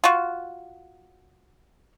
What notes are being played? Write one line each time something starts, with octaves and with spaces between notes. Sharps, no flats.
F4 F#4